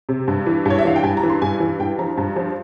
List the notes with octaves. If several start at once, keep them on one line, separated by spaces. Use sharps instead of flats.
C3
G2
E3
G2 C#5
E5
E3 F5
G5
G2 G#5
A#5
E3
C6
G2 G#5
E3
G2 G5
F3 A#5
G2 A#5
F3